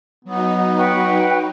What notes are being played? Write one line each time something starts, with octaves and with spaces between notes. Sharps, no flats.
F#3 B3 D#4
B4 F#5 G5 C#6